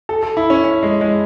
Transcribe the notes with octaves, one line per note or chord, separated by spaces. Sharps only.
A4
A4
E4
C#4
C#4
G#3
G#3